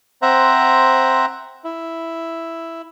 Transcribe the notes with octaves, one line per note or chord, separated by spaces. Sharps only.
C4 C5 E5 F#5 A#5
E4